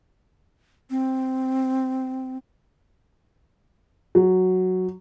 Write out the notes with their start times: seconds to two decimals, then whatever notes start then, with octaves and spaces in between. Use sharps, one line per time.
0.90 C4
4.15 F#3